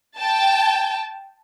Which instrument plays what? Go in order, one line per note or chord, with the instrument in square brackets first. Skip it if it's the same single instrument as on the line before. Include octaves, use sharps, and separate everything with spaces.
[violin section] G5 A5